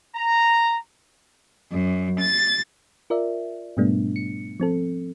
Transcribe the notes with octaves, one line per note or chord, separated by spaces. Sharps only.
A#5
F#2
A6
F4 A#4 D5 E5
G#2 B2 G3 A3 B3 D4
C#7
F3 C4 A4